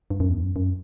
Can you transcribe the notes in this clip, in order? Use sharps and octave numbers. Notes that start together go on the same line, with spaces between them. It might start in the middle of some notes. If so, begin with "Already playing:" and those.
G2
F#2
E2
F#2
F#2